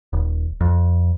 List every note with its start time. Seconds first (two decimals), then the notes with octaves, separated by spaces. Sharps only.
0.13 D#1
0.61 F2